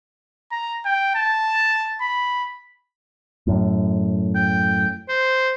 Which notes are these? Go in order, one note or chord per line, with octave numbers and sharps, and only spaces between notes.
A#5
G5
A5
B5
F#2 A2
G5
C5